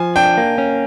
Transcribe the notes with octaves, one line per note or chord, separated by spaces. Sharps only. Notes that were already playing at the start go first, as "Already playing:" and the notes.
Already playing: F3 G#5
D4 G5
A#3
C#4